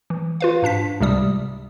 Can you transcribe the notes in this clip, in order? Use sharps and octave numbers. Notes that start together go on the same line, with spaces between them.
E3
F4 B4 F5
G#2 D4 A5 B6
C#2 C3 G3 D#6